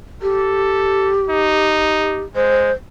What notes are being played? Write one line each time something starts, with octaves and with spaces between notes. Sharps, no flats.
G4 A4
D#4
G#3 C5